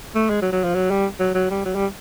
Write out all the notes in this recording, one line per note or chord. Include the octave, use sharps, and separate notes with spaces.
A3
G#3
F#3
F#3
F3
F#3
G3
F#3
F#3
G3
F#3
G3